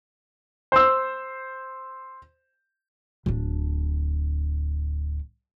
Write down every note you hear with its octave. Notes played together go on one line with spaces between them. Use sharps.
C5 E6
D1 D4